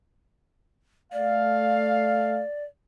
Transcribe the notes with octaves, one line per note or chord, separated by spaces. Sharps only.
A3 D5 F5